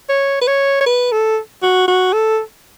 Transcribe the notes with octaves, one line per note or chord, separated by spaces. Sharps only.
C#5
B4
C#5
C#5
B4
A4
F#4
F#4
A4